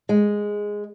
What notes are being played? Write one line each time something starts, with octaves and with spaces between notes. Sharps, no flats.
G#3